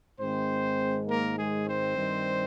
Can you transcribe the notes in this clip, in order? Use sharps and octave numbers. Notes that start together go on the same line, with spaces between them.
G#2 D#3 G#3 C4 C5
A#3 A#4
G#3 G#4
C4 C5
G2 D#3 G3